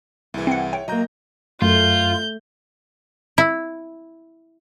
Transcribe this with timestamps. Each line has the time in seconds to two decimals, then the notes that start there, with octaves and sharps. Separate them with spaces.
0.34 C2 E3 E4 G#4
0.47 C4 F#5
0.73 C#5 G5
0.88 F#3 A#3 D#5 A#5 G6
1.62 F#2 A3 F4 G6
3.38 E4